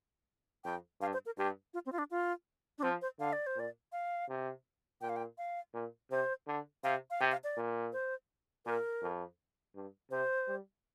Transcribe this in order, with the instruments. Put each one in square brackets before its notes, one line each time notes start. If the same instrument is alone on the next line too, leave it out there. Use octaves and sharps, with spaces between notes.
[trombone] F2 [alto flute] G5
[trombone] G2 [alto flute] F5
[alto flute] C5
A#4
[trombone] G2 [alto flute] G4
[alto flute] F4
C4
F4
D4
F4
D4
[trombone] F3 [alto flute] C4
[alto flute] C5
[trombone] D3 [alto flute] F5
[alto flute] D5
C5
[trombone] A#2 [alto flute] D5
[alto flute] F5
[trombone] C3
[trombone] A#2 [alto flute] G5
[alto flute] F5
G5
F5
[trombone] A#2
[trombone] C3 [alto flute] C5
[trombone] D3
[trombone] C3 [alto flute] F5
[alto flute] F5
[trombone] C3 [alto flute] G5
[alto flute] F5
D5
[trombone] A#2
[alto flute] C5
[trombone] A#2 [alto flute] A#4
[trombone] F2
G2
[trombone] C3 [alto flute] C5
[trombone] G3